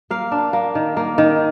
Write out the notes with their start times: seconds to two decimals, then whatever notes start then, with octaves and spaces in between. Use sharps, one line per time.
0.11 A#3 F5
0.32 D4
0.53 A#3
0.75 D#3
0.97 A#3
1.18 D#3